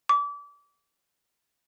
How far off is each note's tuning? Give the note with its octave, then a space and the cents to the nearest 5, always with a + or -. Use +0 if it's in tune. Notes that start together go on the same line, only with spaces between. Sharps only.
D6 -30